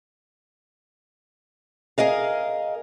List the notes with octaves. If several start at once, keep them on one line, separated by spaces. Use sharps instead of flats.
G#4 A#4 D#5 F5